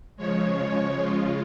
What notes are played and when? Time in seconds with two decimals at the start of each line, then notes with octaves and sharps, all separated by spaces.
0.17 C#3 F3 G#3 C#5
0.97 C#3 G#3 F4